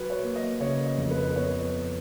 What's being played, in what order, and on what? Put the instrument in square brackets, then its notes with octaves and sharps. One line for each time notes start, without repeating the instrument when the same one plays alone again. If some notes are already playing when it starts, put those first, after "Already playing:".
Already playing: [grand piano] F#3 B4
C#5
A#3
D#5
C#3 C#5
D#5
F2
B4
B3 C#5